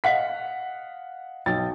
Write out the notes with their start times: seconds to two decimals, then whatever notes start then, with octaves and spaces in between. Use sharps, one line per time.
0.04 D#5 F5 F#5 B6
1.46 B1 G5 A6